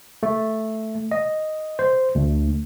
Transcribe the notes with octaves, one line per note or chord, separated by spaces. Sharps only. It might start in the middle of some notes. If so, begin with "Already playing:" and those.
A3
D#5
C5
D2